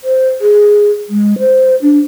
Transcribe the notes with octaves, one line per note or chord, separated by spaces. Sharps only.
C5
G#4
G#3
C5
D4